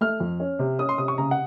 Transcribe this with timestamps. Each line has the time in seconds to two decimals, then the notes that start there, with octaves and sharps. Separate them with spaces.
0.01 A3 F6
0.20 F2
0.40 C#4
0.59 C3
0.79 C#4 D#6
0.89 C6
0.98 C3 D#6
1.08 C#6
1.18 C#3 A#5
1.31 F#5